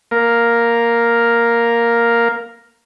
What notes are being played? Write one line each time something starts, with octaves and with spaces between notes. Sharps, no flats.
A#3 A#4 F5